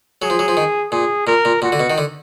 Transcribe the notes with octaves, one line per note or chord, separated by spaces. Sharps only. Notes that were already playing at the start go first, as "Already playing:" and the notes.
F#3 G#4
F3
F#3
F3
D#3
A#2 G#4
A#2 A#4
A#2
A#2 F#4
D3
B2
D#3
D3